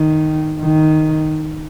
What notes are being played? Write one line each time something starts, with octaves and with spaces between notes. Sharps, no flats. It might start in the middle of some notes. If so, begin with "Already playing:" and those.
Already playing: D#3
D#3